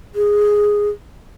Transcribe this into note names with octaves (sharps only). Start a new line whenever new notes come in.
G#4